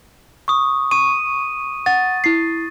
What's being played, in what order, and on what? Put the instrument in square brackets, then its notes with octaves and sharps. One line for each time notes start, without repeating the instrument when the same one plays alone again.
[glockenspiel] C#6 D#6
[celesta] C#6 [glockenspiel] D#7
[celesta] F#5 [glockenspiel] A6
[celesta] E4 C7